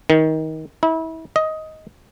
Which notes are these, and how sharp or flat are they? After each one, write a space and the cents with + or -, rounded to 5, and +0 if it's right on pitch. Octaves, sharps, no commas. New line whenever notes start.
D#3 +20
E4 -30
D#5 +10